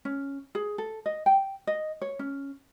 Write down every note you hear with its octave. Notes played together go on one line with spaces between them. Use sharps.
C#4
G#4
A4
D#5
G5
D#5
C#5
C#4